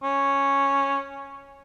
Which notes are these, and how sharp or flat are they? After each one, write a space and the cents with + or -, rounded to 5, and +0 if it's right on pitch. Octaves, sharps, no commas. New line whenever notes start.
C#4 -5